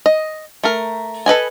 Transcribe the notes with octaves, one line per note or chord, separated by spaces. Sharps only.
D#5
A3 A#4
A4 B4 D#5 G#5